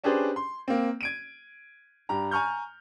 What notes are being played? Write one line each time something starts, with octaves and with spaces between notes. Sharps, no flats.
C#4 D4 G4 G#4 B4 C5
C6
A#3 C4
G#6 D7 D#7
G2 G4 A#5
G#5 A#5 C#6 F6 G6